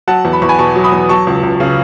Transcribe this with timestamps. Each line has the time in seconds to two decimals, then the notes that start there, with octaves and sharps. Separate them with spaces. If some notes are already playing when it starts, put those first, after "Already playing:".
0.08 F#3 F#5 A5
0.25 E2
0.33 B5
0.42 E2 C#6
0.49 G#5 B5
0.59 B2 A5 C#6
0.76 F#3
0.84 B5 D#6
0.92 E2
1.09 F#3 A5 C#6
1.27 C#2
1.43 C#2
1.60 C#3